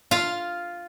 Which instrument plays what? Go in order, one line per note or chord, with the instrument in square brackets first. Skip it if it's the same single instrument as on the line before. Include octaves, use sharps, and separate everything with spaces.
[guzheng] F4 F5